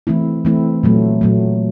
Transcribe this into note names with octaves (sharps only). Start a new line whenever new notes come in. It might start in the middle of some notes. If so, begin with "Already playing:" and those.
E3 A3 C4 E4
E3 A3 C4 E4
A#2 F#3 A3
A#2 F#3 A3